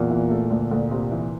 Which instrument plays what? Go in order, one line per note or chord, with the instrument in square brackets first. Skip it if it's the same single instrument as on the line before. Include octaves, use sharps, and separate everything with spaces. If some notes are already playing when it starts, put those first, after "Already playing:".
Already playing: [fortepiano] E2 [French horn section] A#2
[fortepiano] E3
A3
D2
D2
C3
E3